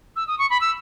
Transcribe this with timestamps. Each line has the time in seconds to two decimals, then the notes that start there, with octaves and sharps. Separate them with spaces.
0.16 E6
0.28 D#6
0.39 C#6
0.50 B5
0.61 E6